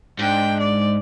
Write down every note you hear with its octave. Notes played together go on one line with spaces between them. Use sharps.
G#2 D4 G5
D5